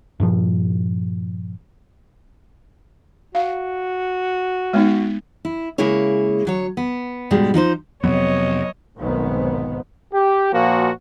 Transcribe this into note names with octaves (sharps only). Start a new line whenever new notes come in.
G2 A#2 F3
F#4 F5
G#3 B3 D#4
E4
C#3 G#3 A#3 E4 G#4 C#5
D2 F#3 C#5
B3
G#2 B2 G3 G#3
F3 D#4 B4 C5
F2 C3 F#3 B3 C#5 D#5
F1 B1 G#2 D#3 B3
G4
A#2 F3 A#3 F#4